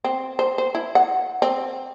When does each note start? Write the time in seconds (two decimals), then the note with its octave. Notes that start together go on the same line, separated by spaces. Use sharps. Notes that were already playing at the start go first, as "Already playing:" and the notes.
0.04 C4
0.39 C5
0.58 C5
0.75 E4
0.95 F#5
1.42 C4